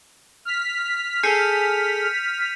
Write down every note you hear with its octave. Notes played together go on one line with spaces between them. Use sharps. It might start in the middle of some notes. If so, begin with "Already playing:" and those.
F6 B6
G#4 A4 G6 C#7 D#7